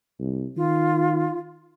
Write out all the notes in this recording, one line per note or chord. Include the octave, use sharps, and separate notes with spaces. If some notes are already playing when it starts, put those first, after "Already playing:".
C2
D#3 F4